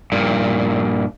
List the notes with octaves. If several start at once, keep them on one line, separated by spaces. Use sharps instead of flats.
G2 A#2